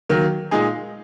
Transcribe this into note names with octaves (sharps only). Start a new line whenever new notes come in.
D#3 F#3 A#3
A#2 G#3 D#4 G#4